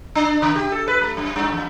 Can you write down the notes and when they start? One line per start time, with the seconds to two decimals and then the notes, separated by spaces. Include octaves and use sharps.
0.15 D4
0.42 C#3
0.55 G4
0.72 A4
0.88 B4
1.01 A3
1.17 F#2
1.36 G2
1.52 E2